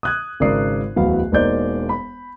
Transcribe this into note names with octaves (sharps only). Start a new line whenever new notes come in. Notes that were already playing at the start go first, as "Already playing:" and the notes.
D#6 F#6 G#6
G#1 C#3 A#4 D5 D#6 C7
D1 E2 F#3 B3 F5
E1 A#3 D#4 C5 D5 G6
B5